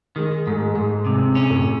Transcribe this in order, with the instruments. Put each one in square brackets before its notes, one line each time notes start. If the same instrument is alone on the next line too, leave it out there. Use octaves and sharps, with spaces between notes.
[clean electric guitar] D#3 [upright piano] G#3
[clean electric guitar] G#2 [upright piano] A3
[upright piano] G#3
[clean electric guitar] G#2
C3
C#4
[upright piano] A2